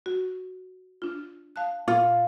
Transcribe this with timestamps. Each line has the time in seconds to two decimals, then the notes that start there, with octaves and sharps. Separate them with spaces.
0.06 F#4
1.02 D4 F4
1.56 F5 A5 F#6
1.88 A#2 F4